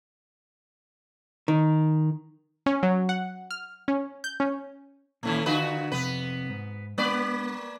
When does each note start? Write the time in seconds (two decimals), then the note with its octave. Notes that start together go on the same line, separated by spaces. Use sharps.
1.48 D#3
2.66 C#4
2.83 F#3
3.09 F#5
3.51 F6
3.88 C#4
4.24 G6
4.40 C#4
5.23 A#2 D#3 E3 A3 C#4
5.46 D3 F4 F#4 B4
5.92 F2 C3 B3 B4
6.50 G#2
6.98 G#3 A#3 B3 D4 B4 D5